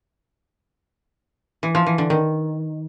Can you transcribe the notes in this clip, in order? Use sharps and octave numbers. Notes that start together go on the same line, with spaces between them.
E3
F3
E3
D3
D#3